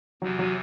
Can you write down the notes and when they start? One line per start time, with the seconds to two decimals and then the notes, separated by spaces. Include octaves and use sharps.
0.22 E2 C3 E3 F#3
0.39 F#3